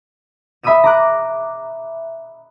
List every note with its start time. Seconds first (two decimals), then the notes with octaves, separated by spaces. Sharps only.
0.63 E5 B5 D#6 E6 D#7 E7
0.84 A#5 D6 F#6